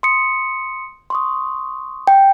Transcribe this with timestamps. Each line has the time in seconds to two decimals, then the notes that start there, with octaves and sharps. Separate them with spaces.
0.03 C6 D#6 C#7
1.10 C6 C#6 D#6
2.07 G5